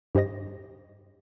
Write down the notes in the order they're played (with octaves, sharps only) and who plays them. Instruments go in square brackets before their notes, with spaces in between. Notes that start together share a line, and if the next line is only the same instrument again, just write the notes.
[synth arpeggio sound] G2 G4 C5 D#5 A#6